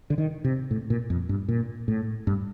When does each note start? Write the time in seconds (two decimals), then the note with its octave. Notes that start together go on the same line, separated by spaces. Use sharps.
0.10 D3
0.18 D#3
0.44 C3
0.71 A2
0.90 A#2
1.10 F2
1.29 G2
1.48 A#2
1.88 A2
2.27 G2